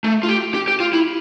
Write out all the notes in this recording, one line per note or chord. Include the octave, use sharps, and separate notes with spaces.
A3
F4
G4
G4
G4
F4
E4